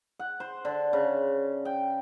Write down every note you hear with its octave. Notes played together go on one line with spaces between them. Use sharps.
F#5
C5
D3
C#3
G5